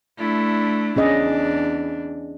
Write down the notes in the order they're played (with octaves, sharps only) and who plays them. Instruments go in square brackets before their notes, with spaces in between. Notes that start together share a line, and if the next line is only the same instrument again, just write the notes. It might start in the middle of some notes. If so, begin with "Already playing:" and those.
[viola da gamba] A3 D4 E4
[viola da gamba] E2 D4 [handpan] C#4 G#4 D#5